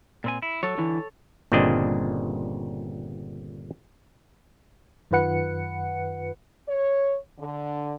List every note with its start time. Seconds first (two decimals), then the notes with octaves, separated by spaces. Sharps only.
0.24 A#2 C4 G#5
0.42 E4
0.63 F#3 A4 C#5
0.78 D3 E3
1.52 G1 A#2 C#3 C4 D4 D#5
5.11 F#2 D#3 F4 B4 F#5 C#7
6.68 C#5
7.38 D3